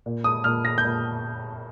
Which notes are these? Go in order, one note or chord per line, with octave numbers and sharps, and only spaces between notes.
A#2
D#6
A#2 F6
A#6
G6
A#2